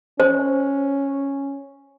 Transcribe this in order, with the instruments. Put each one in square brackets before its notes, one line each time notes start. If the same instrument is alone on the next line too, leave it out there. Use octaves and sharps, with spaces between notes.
[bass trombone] C#4 [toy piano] C5